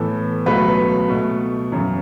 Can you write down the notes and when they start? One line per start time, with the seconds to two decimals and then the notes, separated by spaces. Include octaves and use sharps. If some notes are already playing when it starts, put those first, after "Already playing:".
Already playing: A2 E3 B3 A4
0.46 C#2 B2 F#3 A3 B4
1.09 B2 A3
1.72 F#2 C#3 E3